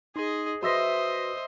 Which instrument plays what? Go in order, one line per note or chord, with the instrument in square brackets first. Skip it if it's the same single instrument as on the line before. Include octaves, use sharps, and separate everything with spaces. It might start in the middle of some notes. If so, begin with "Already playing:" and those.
[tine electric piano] D#4 C6 [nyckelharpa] G#4 D#5
[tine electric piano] F#4 B4 [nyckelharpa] C5 D#6 [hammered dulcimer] D#5 E5 C6